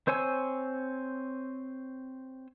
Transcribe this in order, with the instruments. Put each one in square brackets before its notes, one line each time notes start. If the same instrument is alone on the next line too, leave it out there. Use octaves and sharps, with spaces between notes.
[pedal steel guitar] C4 C5 C#5 G#5 E6